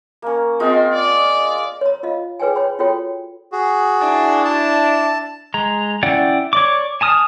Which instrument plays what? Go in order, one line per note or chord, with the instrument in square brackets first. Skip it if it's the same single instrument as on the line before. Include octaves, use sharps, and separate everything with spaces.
[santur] A#3 C#4
[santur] G#3 F4 D#5 [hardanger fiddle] C4
[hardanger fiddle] D5
[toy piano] C#5 A#5
F4 D#5 F5
G#4 B4 C#5 G5 G#5
C#5 G5 B5
F4 F#4 A4 C#5 G5
[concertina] F#4 G#4
[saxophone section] D4 E4
[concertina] A5
[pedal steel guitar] G#3 A#5
C#4 E4 D5 F#5 G5
C#5 D5 D6
G#5 A5 D#6 F6